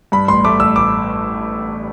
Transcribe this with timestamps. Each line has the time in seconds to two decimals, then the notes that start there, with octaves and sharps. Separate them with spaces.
0.12 G2 B5
0.28 A1 C6
0.45 A3 D6
0.60 A1 E6
0.76 A1 D6